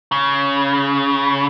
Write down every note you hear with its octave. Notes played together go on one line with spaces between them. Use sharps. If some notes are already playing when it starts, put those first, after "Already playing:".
C#3